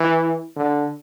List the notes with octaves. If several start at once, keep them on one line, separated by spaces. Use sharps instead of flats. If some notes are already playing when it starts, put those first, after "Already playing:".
Already playing: E3
D3